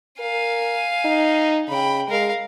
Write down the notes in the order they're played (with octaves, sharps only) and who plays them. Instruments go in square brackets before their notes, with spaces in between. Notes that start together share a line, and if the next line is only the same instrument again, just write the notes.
[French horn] A#4 [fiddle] F5 G#5
[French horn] D#4
[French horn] C#3 [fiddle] G5 B5
[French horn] G#3 [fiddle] A#4 F5